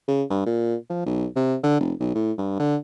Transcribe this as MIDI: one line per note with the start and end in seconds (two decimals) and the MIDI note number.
0.08 0.23 49
0.30 0.45 43
0.46 0.75 46
0.90 1.01 53
1.06 1.26 35
1.36 1.56 48
1.63 1.80 50
1.80 1.93 29
2.00 2.13 35
2.15 2.32 45
2.38 2.56 43
2.60 2.76 50